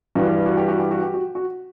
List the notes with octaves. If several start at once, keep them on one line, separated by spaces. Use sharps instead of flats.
G2 E3 G3 F#4
F#4
G4
F#4
G4
F#4
G4
F#4
F#4